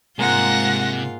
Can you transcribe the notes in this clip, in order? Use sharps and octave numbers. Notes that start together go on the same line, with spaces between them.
G#2 C3 G#3 A#3 F4 F#5 A#6